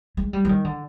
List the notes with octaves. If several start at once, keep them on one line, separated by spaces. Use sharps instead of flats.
G#3
G3
F3
D#3
D3